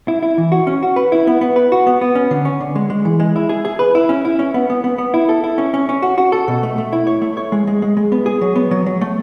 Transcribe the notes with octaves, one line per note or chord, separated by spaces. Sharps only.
E4
E4
E3
F#4
C#4
F#4
B4
E4
B3
B3
B4
F#4
B3
B3
C#4
D3
C#4
D3
G#3
G#3
E3
G#3
E4
G#4
G#4
B4
E4
C#4
E4
C#4
B3
B3
B3
B3
E4
A4
E4
C#4
C#4
C#4
F#4
F#4
A4
B2
A3
A3
E4
C#5
A3
C#5
G#3
G#3
G#3
G#3
B3
G#4
F#3
B3
F#3
F#3
A3